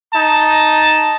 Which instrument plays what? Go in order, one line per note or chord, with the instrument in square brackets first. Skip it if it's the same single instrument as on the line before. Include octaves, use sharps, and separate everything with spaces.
[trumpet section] D#4 A5